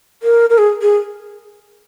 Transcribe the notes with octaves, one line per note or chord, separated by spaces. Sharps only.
A#4
A#4
G#4
G#4